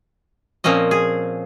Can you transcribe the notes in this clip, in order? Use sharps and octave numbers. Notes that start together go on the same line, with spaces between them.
A#2 F3 C4 C#4 D#5
G#4